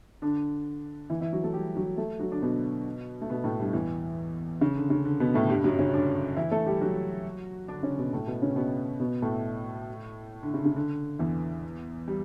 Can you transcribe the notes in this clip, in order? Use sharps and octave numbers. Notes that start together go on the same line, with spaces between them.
D3 D4
E3 E4
E3 E4
F#3 F#4
A3 A4
G3 G4
F#3 F#4
A3 A4
F#3 F#4
D3 D4
B2 B3
A3
B2 B3
A2 A3
G2 G3
E2 E3
C#3
D3
C#3
D3
B2 B3
A2 A3
G2 G3
F#2 F#3
C#3 C#4
D3 D4
E3 E4
A3 A4
G3 G4
F#3 F#4
D3 D4
C#3 C#4
B2 B3
A2 A3
B2 B3
C#3 C#4
B2 B3
B2 B3
A2 A3
D3
C#3
C#3
D3
E2 E3
G3